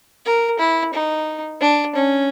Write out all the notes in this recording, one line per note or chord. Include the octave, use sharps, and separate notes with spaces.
A#4
E4
D#4
D4
C#4